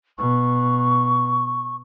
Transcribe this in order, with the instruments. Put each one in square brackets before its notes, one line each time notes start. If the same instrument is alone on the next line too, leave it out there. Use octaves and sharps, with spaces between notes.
[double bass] B2 [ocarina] C#6